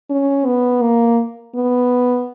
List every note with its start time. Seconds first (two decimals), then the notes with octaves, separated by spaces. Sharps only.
0.10 C#4
0.46 B3
0.82 A#3
1.55 B3